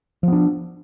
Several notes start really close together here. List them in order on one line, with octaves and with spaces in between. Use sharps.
F3 B3 D4